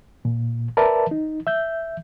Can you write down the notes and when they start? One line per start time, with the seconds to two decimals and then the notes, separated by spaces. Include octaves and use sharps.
0.25 A#2
0.77 A#4 B4 D5 E5 A5
1.11 D#4
1.47 E5 G6